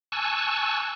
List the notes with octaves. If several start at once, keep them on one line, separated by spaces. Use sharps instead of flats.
G#5 A5 C#6 E6 F#6